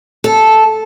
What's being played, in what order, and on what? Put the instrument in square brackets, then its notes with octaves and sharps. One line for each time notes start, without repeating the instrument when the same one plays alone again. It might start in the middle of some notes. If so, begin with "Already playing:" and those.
[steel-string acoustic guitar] A4